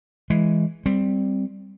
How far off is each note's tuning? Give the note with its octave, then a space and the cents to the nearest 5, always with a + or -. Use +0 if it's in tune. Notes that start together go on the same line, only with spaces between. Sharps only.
E3 +0 G#3 +0
G3 +0 C4 +0